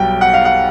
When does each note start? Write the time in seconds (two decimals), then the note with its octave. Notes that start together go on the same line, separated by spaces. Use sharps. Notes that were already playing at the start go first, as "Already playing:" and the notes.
Already playing: B1 B2 G3 G5
0.21 F#5
0.34 F5
0.45 F#5